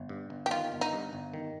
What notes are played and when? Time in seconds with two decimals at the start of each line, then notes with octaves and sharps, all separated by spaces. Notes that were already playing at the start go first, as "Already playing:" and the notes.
Already playing: G1
0.09 G2
0.30 G1
0.46 G4
0.51 D#3 F4
0.72 G1
0.81 D#4
0.93 G2
1.13 G1
1.33 D#3